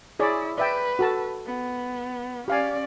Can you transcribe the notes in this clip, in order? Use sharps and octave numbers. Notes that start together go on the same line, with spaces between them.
E4 G#4 C#5 D5
B4 D5 E5 G5
F#4 A4 A5
B3
C#4 G4 D5 F5 G#5